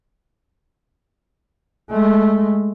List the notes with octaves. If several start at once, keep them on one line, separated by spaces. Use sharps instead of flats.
G#3 A3